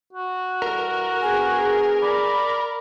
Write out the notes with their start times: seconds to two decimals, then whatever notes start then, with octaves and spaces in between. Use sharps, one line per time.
0.13 F#4
0.62 E3 G3 A4 A#4
1.22 D3 B3 G#4 G#5
2.01 D5 B5